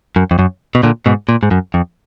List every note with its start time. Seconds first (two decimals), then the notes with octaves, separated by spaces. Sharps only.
0.16 F#2
0.31 F2
0.39 F#2
0.75 B2
0.83 A#2 D3
1.06 G#2 B2
1.29 A#2
1.43 G#2
1.51 F#2
1.74 F2